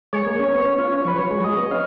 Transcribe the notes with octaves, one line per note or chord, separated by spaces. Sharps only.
G#3 C#5
A#3
C#4
B3
C#4
F4
C#4
F3 B4
F#3 C#5
G#3
F#3
G#3 D#5
B3
C#4 F5